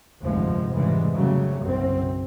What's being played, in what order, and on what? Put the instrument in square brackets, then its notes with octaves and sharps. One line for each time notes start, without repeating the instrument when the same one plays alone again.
[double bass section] F1 D2 G2 F3 G#3
F1 G#2 C#3 E3 G3 G#3
C#3 F#3 G3 A3
F#1 B1 F#2 C4